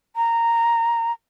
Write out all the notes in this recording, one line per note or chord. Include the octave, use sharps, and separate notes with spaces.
A#5